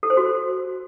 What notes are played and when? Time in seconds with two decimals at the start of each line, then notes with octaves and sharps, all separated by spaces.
0.03 A4
0.10 C5
0.17 F#4